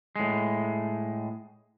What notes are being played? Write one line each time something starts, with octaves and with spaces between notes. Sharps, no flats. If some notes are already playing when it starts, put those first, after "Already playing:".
A2 G#3